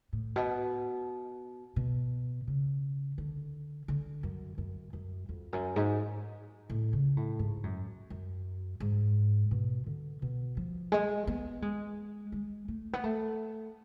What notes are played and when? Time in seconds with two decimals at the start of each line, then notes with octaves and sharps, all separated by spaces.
0.13 A2
0.36 B2
1.76 B2
2.47 C#3
3.18 D3
3.88 D3
4.23 F#2
4.58 F#2
4.93 F#2
5.29 F2
5.53 F#2
5.76 G#2
6.70 A2
6.93 C#3
7.17 A2
7.39 G#2
7.63 F#2
8.10 F#2
8.80 G#2
9.51 B2
9.86 D3
10.22 B2
10.57 F3
10.92 G#3
11.27 B3
11.62 G#3
12.32 G#3
12.68 A3
12.93 B3
13.04 A3